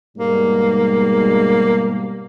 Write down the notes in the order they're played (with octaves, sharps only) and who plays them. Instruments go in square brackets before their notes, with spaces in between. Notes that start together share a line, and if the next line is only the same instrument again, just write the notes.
[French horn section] G#2 B2 G3 [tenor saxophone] A#3